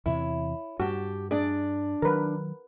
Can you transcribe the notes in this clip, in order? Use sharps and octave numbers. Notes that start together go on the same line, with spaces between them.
E2 C3 E3 E4 C#5
G2 F#4 G4 A5
D4 G#4 D5
D#3 F#3 A#4 B4